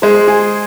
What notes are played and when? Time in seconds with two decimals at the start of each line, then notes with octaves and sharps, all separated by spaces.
0.02 G#3 C5
0.27 G#4